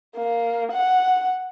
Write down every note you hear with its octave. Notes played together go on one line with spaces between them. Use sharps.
A#3
F#5